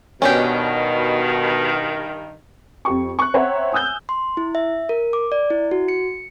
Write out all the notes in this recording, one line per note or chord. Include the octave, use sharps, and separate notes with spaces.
G2 B2 D#3 C#4 D4 G4
F2 G4 C#6
C#6 F#6
C5 C#5 E5 F#5 G5 A#5
G#5 D#6 E6 F#6 G6
C6
E4
E5
A#4
D6
D5
E4
F#4
C#7